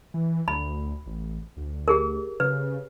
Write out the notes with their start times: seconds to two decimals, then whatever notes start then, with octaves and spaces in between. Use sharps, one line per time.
0.14 E3
0.48 D2 B5
1.06 A1
1.57 D2
1.88 G4 G#4 A#4
2.40 C#3 B4